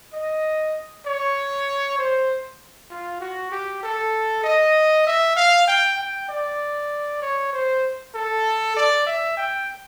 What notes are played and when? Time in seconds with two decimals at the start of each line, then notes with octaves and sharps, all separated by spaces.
0.13 D#5
1.06 C#5
1.98 C5
2.90 F4
3.20 F#4
3.51 G4
3.83 A4
4.44 D#5
5.07 E5
5.36 F5
5.67 G5
5.98 G5
6.29 D5
7.22 C#5
7.53 C5
8.14 A4
8.76 D5
9.06 E5
9.37 G5